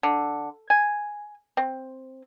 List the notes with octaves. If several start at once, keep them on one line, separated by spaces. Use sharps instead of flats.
D3
G#5
C4